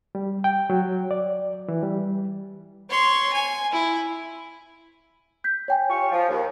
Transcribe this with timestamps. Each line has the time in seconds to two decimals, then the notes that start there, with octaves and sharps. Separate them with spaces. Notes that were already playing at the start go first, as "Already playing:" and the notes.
0.15 G3
0.44 G5
0.70 F#3
1.11 D5
1.68 E3
1.83 G3
2.90 C#5 C6
3.33 G#5
3.72 E4
5.44 G6 B6
5.68 C#5 G5 G#5
5.89 F4 G4 C#6
6.12 F3
6.29 D#2